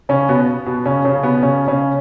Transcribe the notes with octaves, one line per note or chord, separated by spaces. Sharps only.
C#3 C#4
B2 B3
B2 B3
C#3 C#4
C#3 C#4
B2 B3
C#3 C#4
C#3 C#4